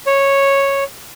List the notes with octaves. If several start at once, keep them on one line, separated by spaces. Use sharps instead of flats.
C#5